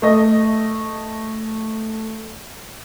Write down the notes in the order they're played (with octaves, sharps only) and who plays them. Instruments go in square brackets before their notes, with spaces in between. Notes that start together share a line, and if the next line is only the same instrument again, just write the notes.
[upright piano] A3 D#5